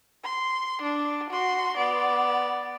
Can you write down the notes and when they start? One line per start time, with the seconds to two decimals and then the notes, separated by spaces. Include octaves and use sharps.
0.24 C6
0.82 D4
1.30 F#4 C6
1.77 B3 D5